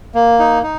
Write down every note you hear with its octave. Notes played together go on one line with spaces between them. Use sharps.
A#3
D#4
D#4